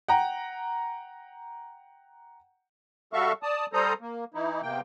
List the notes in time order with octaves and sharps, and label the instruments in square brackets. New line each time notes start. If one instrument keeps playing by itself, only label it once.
[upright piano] F#5 G5 A#5
[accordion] G3 F#4 A4 E5 F5 C#6
D5 A5 D#6
G3 A4 C5 A#5 D#6
A#3
E3 D#4 E4
E2 C3 A#3 G5